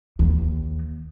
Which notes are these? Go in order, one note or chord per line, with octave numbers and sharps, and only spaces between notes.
D#2